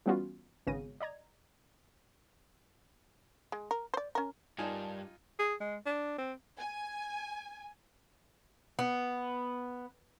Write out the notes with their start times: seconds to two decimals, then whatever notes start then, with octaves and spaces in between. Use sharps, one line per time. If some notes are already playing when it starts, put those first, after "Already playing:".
0.06 E3 G3 B3 C#4 F4 F#4
0.67 G#1 C#3 B3 A#6 D#7
1.00 D5 D#5 A#5 G#6
3.52 G#3
3.71 A#4
3.94 C5 D5
4.15 C#4 A#4
4.58 G2 D#4 F4 A#4 D5 G#5 A5
5.39 G#4
5.60 G#3
5.86 D4
6.18 C4
6.58 G#5
8.79 B3